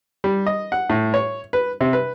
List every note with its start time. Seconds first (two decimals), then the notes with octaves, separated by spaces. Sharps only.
0.24 G3
0.46 D#5
0.72 F#5
0.90 A2
1.14 C#5
1.53 B4
1.81 C3
1.93 B4